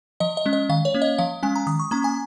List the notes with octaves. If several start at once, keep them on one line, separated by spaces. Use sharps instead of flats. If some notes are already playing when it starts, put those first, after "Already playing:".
F3 D#5
D#5
G#3 C#4
D#5
D#3 F5
C#5
A#3 C#4
D#5
F3 F5
G#3 C#4 G#5
A#5
D#3 D#6
C#6
A#3 C#4 A#5
G#5